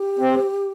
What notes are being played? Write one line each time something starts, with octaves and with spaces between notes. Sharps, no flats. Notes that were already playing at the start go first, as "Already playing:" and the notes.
Already playing: G4
C4